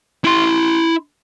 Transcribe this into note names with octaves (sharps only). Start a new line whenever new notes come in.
E4 C6